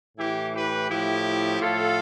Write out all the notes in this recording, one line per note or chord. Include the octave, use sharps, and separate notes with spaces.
A2 E3 E4 G4
G4 B4
A2 F3 E4 G4
A2 F3 F4 A4